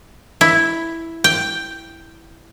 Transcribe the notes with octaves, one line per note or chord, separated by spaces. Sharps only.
E4
G5